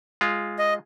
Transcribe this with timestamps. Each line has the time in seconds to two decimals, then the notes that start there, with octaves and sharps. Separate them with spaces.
0.21 G#3 F4
0.59 D#5